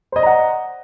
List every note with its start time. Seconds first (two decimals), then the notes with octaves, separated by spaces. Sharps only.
0.12 C5
0.16 D#5
0.19 D5
0.23 A#5
0.26 F#5